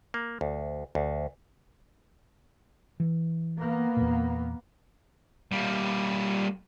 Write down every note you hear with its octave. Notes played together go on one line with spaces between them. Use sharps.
A#3
D2
D2
E3
A#3 B3
E2 A#2
G3 A#3